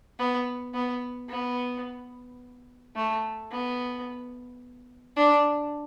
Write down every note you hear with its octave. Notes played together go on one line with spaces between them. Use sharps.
B3
B3
B3
A3
B3
D4